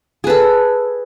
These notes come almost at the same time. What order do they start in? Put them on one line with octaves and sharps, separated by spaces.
G#4 B4 A4